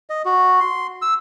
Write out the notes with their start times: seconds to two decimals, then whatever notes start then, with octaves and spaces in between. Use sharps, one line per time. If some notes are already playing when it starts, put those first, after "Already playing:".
0.10 D#5
0.25 F#4
0.60 C6
1.02 E6